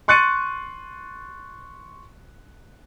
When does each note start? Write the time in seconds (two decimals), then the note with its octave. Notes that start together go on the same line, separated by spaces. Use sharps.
0.08 C6 C#6 F#6 A6 C#7 D#7